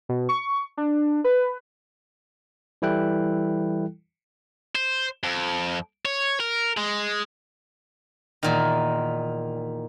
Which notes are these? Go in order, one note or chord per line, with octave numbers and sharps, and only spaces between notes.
B2
C#6
D4
B4
E3 G3 E4 A4 G5 F#6
C5
F2
C#5
A#4
G#3
E2 A#2 D#3